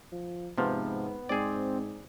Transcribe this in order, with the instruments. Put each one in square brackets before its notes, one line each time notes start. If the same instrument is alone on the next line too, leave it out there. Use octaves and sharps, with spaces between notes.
[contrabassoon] F3
[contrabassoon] G#2 [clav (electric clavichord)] C3 F3 [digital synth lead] B3
[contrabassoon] G#2 [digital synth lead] C4 [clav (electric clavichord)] G#4 D5